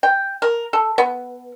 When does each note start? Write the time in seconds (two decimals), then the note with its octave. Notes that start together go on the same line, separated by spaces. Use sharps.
0.03 G5
0.42 A#4
0.73 A4
0.98 B3